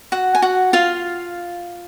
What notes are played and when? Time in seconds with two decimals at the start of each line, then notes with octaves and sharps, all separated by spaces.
0.12 F#4 F#5
0.35 G#5
0.42 F#4 F#5
0.73 F4 F5